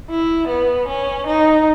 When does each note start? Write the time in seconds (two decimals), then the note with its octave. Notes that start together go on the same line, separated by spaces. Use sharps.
0.10 E4
0.49 B3
0.88 C#4
1.27 D#4